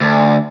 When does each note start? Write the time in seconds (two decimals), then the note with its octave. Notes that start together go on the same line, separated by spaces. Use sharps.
0.01 D2